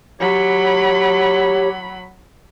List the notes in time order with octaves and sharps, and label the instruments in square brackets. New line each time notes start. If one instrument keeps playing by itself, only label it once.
[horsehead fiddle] F#3 B5 [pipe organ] G4 C#5